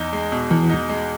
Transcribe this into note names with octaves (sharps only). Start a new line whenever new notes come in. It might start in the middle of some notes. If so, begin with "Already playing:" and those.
Already playing: E2 D#4
G#3
B2
E2 E3
D#4
G#3